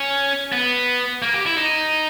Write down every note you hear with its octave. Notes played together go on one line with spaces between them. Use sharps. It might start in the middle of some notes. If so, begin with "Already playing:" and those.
Already playing: C#4
B3
A#3
G4
E4
D#4